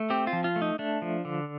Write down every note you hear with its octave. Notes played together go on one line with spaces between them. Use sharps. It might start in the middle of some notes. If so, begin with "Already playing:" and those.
Already playing: A3
C4 G4
F4
F3
F4
A3
D#4
A3 D4
F3
D3